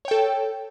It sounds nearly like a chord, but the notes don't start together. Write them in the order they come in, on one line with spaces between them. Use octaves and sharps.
C#5 G5 A4